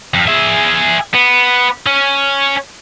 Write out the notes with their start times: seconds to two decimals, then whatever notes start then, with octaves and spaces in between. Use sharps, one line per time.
0.14 F2
0.28 G#4 E5
1.14 B3
1.87 C#4